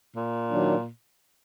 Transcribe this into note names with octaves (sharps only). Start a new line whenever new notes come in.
A#2
D#3 F#3 D4